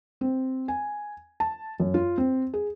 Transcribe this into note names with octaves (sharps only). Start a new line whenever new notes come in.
C4
G#5
A5
F#2
F4
C4
G#4